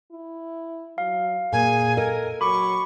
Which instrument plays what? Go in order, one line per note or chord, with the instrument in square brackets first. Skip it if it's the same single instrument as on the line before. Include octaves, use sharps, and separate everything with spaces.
[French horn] E4
[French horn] F#3 [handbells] F5
[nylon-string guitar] A#2 [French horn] G#4 [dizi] G#5
[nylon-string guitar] A4 D#5 [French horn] A#4
[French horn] F#3 [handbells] B5 D6 [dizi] C#6